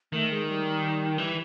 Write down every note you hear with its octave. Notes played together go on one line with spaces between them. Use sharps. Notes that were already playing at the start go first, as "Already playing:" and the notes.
D#3 A3
G#3
G3
E3